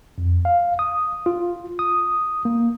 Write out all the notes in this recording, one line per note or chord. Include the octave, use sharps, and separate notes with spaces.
F2
F5
D#6
F4
D#6
A#3